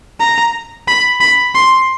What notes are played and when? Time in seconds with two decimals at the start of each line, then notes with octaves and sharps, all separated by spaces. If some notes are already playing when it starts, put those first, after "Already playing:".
0.20 A#5
0.88 B5
1.20 B5
1.55 C6